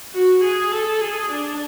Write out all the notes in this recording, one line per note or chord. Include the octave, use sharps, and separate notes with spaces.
F#4
G#4
A4
G#4
D4